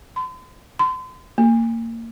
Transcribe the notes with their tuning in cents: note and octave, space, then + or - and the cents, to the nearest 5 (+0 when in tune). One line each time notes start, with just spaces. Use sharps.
C6 -45
C6 -40
A#3 -25